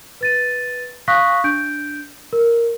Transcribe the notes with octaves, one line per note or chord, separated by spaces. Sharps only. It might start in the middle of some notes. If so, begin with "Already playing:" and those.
B4 A6 D#7
F5 C#6 D#6 F#6 A#6 B6
D4 G6 D7
A#4